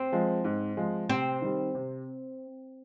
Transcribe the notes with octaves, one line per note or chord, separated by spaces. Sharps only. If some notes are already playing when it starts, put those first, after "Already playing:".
Already playing: C4
F3 G#3
G#2
F3 G#3
C3 C4
D#3 G3
C3